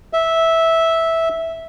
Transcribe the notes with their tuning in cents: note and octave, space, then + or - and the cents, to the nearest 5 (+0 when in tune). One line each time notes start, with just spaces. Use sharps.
E5 -10